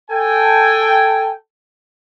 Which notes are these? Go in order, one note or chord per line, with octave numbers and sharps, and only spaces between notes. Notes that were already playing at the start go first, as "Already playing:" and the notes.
A4 G5 G#5